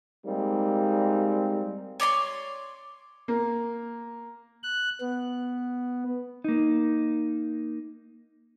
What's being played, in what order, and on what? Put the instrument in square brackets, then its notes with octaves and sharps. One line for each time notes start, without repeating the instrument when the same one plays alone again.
[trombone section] G3 G#3 A#3 C4 D#4
[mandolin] C#5 D5 A#5 C6
[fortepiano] A#3
[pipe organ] F#6
B3
[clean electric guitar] A#3 D#4